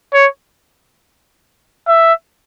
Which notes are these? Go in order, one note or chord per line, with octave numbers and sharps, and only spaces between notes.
C#5
E5